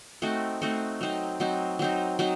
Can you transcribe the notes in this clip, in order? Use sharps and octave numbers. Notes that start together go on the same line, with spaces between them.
A3 C4 D#4 F#4
A3 C4 D#4 F#4
F#3 C4 D#4
F#3 C4 D#4
F#3 C4 D#4
F#3 C4 D#4